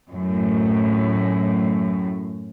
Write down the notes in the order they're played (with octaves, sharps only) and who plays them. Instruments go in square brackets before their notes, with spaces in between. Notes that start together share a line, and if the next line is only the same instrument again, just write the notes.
[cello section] F#2 A2